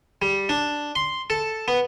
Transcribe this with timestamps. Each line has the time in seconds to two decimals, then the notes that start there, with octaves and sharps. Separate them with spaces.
0.22 G3
0.49 D4
0.95 C6
1.30 A4
1.68 B3